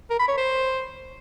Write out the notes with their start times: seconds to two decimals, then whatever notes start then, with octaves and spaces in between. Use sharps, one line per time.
0.10 A#4
0.19 B5
0.28 C#5
0.38 C5